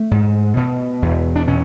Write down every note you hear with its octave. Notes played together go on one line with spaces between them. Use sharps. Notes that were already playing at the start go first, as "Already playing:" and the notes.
Already playing: A3
G#2
B2
E2
D4
B2 C#4